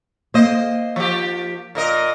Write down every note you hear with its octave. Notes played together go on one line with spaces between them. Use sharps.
A#3 C5 D#5
F3 G4
A#2 A#4 D#5